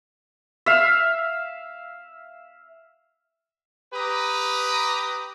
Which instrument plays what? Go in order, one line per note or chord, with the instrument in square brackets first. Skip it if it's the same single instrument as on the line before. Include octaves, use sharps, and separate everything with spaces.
[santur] E5 F5
[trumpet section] G4 B4 A#5 D#6